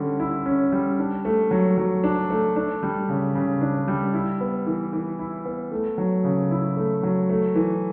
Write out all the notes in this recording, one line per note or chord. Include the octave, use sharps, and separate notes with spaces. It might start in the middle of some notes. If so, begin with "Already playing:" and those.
Already playing: D3 G3 C#4
E4
C#4
G3
D4
A3
F#3
F#3
D4
A3
D4
G3
C#3
C#3
D4
G3
E4
B3
E3
E3
E4
B3
A3
F#3
C#3
E4
A3
F#3
A3
E3